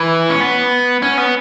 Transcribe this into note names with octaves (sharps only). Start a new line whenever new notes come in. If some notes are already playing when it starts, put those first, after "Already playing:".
Already playing: E3
C#4
B3
C#4
B3